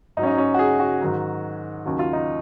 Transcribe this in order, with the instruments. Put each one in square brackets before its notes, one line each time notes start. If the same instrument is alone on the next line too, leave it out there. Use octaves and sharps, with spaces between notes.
[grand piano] G#2 F#3 D#4
C#4
D#4
C#4
F#4
G#4
F#4
G#2 D#3 F#3
D#2 C#3 F#3
F4
D#4